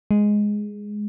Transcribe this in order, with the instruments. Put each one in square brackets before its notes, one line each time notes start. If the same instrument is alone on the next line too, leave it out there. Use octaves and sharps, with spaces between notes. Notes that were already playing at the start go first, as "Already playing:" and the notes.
[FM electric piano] G#3